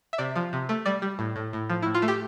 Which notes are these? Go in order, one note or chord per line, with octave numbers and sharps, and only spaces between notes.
E5
C3 D5
F3
C3
A3
G3 D5
G3
A2
A2
A2
F3
A2 E4
F4
A3
G4